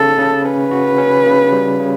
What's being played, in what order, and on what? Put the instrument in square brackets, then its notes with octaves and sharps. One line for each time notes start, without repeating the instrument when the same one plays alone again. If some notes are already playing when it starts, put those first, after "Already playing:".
Already playing: [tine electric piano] C#3 [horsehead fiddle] A4
[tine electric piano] C#3
[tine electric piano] C#4 [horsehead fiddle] B4
[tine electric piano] F#4
C#4
C#3
G3
C#3